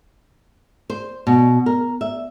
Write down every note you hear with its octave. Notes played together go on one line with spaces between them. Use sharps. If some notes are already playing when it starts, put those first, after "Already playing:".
C5
B2
A#4
E5